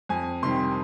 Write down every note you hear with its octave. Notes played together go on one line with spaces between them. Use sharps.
F2 G#5
C3 D#3 G3 C6